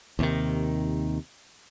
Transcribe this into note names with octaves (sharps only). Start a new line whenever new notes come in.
D#2 C3 D#3